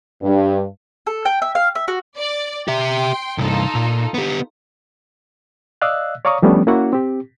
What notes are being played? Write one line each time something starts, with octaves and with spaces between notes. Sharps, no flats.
G2
A4
G5
E5
F5
E5
F#4
D5
G4 E5 G5 C6
C2 G2 D#4 F4 A4
A#2
B3 G4
D5 D#5 F5 E6 F#6
C#5 D5 F5 A#5 C#6 D#6
F3 G3 A3 B3 C#4 D4
A#3 C#4 E4 F#4 F#5
C4 G4